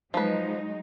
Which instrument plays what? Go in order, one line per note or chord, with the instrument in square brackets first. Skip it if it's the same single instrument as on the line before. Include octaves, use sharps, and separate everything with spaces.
[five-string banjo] F3 B4 [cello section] F#3 G#3 D#4